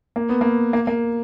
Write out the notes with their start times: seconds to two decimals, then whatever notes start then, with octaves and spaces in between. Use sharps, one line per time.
0.16 A#3
0.29 B3
0.41 A#3
0.73 A#3
0.87 A#3